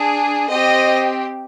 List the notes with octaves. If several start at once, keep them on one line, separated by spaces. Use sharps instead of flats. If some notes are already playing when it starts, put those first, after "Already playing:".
Already playing: D4 G#4
C4 G4 D#5